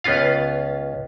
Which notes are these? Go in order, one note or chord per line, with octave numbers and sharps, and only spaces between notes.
C#2 B3 C#4 F4 F5